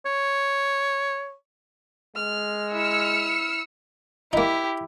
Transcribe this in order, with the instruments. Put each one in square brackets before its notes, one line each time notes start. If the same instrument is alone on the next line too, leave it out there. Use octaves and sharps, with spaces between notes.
[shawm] C#5
[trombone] G#3 [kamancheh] F6
[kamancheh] E4 [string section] E6 F6 C#7
[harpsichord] A#3 D#4 [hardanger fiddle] E4 G4